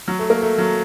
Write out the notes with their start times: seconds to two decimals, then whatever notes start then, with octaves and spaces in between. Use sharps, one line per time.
0.08 F#3
0.19 A3
0.30 A#3
0.42 A3
0.58 F#3